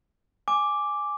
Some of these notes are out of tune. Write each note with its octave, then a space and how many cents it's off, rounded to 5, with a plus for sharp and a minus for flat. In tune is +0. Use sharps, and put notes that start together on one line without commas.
G#5 +0 D6 +0